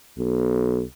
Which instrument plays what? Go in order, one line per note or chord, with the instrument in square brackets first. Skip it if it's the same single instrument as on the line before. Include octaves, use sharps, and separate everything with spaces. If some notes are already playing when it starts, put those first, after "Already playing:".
[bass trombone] B1